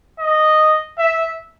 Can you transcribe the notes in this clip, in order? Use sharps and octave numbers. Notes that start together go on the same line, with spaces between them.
D#5
E5